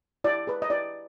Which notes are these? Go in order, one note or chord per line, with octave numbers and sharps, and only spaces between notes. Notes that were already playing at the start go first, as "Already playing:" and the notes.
E4 D5
G#4 B4
D#5
E4 D5